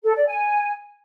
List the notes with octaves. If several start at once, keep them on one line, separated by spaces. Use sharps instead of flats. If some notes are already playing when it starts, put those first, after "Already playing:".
A4
D5
G#5